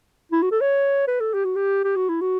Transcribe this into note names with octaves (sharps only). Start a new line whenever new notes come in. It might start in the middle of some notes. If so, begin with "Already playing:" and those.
E4
F#4
A4
C#5
B4
A4
G4
F#4
G4
G4
F#4
E4
F#4